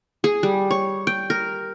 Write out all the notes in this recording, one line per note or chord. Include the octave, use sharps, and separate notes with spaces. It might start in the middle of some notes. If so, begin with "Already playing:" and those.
G#4
G3
C#5
G5
A#4